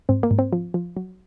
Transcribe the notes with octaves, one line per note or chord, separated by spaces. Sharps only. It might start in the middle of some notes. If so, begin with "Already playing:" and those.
G#2 C4
A#3
G#2
C4
F3
F3
F#3